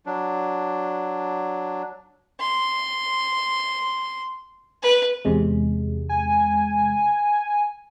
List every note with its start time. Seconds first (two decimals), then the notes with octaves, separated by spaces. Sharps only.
0.06 F#3 D4
2.40 C6
4.83 B4
5.25 E2 C3 G#3
6.09 G#5